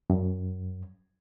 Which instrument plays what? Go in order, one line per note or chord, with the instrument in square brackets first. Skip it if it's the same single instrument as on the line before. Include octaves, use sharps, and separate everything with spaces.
[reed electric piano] F#2